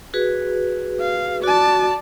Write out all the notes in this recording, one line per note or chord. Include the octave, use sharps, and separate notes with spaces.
F#4 G#4 B4
F5
F#4 D5 A5